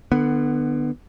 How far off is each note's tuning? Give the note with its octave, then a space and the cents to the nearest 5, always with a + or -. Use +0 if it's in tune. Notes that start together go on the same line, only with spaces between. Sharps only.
D3 +30 B3 +0